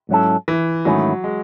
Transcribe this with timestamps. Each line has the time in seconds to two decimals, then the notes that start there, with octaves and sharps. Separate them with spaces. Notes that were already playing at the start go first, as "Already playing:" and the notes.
0.09 G#2 F#3 C#4 E4 A4
0.48 E3
0.85 G#2 D#3 F#3 A3 C#4 E4
1.24 G#3